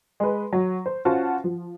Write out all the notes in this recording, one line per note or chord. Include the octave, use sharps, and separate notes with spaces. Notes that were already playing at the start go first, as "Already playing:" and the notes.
G#3 B4
F#3
C5
C#4 F4 F#4 C5 F#5 A5
F3